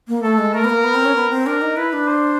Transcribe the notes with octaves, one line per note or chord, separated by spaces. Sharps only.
A#3
A3 A4
G#3
A3 A#4
B3
A#3
B3
C4
C#4
B3
C4
D4 A#4
D#4
E4 B4
D4
C5